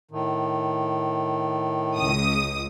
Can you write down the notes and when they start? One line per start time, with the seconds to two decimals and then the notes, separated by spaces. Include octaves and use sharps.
0.11 A2 D#3
1.96 C#2 D#6